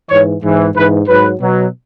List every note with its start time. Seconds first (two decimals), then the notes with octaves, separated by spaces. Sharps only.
0.10 G#2 E3 C#5
0.43 G#2 E3
0.75 G#2 E3 B4
1.08 G#2 F#3 B4
1.40 B2 F#3